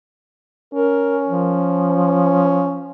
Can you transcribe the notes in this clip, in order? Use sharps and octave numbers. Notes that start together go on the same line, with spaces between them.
C#4 A#4
F3